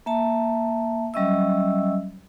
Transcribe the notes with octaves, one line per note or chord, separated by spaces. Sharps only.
A#3 E5 A5
F#3 G3 C#4 D#5 E5 E6